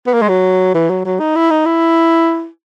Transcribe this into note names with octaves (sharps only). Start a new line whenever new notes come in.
B3
A#3
G#3
F#3
E3
F#3
F#3
D#4
E4
D#4
E4